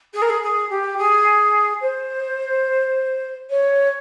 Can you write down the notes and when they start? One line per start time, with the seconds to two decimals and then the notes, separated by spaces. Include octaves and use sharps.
0.13 G#4
0.22 A#4
0.30 G#4
0.42 G#4
0.69 G4
0.97 G#4
1.82 C5
3.50 C#5